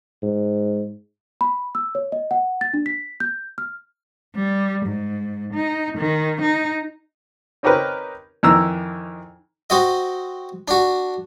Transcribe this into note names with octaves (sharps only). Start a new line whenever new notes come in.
G#2
B5
E6
C#5
D#5
F#5
A6
D4
B6
G6
F6
G3
G#2
D#4
D#3
D#4
C4 C#4 D#4 G4 A#4 B4
F2 D#3 E3 A#5 E6
C4 F#4 D#5
D4 F#4